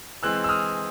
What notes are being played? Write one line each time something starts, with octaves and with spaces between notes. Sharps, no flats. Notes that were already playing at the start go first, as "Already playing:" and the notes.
E3 G#3 C4 E6 F#6
E6
D#6 F6